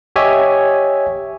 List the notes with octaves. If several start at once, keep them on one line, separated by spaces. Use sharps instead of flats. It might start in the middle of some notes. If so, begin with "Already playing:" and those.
G4 C#5 D#5 E5 G#5